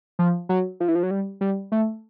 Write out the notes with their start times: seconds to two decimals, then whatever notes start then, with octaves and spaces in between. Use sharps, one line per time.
0.19 F3
0.49 F#3
0.80 F3
0.88 E3
0.95 F3
1.03 F#3
1.11 G3
1.41 G3
1.72 A3